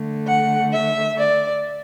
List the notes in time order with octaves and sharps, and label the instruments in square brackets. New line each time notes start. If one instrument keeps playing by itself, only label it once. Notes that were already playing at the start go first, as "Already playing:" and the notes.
Already playing: [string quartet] D3 A3
F#5
E5
D5